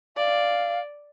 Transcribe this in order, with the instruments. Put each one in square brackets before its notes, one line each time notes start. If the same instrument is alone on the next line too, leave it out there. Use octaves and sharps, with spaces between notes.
[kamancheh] D5 [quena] F5